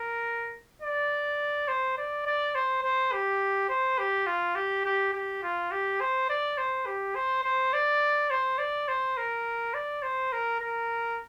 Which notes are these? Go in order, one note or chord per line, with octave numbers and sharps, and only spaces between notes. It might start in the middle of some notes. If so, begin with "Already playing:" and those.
Already playing: A#4
D5
C5
D5
D5
C5
C5
G4
C5
G4
F4
G4
G4
G4
F4
G4
C5
D5
C5
G4
C5
C5
D5
C5
D5
C5
A#4
D5
C5
A#4
A#4